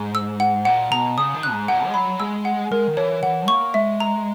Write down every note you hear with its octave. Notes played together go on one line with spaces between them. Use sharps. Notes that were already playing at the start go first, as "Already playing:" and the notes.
Already playing: G#2
E6
F#5
A#2 F#5
B2 A#5
C#3 D#6
D#3
F#6
G#2
A#2 F#5
G#3
F#3 B5
G#3 E6
F#5
G#3 A#4
D#3
E3 C#5
E3 F#5
A#3 C#6
G#3 E5
A#5